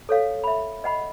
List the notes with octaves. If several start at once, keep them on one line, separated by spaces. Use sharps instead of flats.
A4 C#5 F5
E5 B5
D#5 F#5 B5